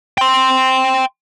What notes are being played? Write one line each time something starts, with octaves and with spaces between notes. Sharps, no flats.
G5 C6